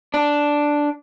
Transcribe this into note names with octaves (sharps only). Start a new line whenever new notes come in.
D4